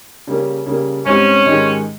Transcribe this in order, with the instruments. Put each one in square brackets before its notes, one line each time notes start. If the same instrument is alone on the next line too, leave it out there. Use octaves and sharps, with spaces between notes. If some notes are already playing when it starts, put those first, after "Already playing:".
[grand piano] C#3 G3 A#3 C#4
C#3 G3 A#3
[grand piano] G#2 G3 C4 D#4 G4 [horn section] C#4
[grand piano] G#2 D#3 G#3 D#4 G4